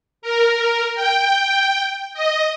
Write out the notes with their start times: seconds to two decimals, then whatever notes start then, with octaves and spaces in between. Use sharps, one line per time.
0.22 A#4
0.95 G5
2.14 D#5